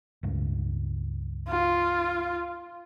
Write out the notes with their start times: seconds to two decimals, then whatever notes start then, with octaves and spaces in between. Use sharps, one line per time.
0.23 C#2 G2
1.48 F4